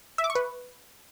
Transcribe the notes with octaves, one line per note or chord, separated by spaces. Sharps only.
E5
D6
C#6
B4